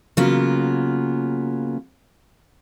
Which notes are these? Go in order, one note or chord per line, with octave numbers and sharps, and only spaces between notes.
C#3 F#3 A#3 B3 F4